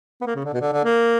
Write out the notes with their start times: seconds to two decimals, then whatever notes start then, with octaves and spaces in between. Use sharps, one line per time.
0.21 B3
0.26 A#3
0.35 C#3
0.45 D3
0.53 B2
0.61 D3
0.73 D3
0.84 A#3